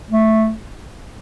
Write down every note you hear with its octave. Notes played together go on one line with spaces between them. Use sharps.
A3